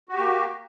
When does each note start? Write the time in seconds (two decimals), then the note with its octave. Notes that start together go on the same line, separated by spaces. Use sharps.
0.09 F#4
0.14 G4
0.19 A#3